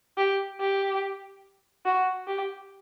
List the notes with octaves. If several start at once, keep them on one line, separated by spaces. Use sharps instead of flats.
G4
G4
F#4
G4